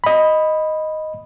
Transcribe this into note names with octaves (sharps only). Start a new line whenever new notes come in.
D#5 B5